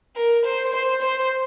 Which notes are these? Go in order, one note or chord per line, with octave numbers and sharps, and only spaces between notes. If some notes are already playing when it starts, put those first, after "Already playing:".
A#4
C5
C5
C5